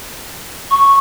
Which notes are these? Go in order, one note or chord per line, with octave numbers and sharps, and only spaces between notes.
C#6